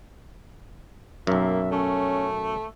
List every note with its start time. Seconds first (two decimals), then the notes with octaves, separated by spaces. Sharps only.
1.27 B1 F#2 A#3 E5
1.72 A3 C#4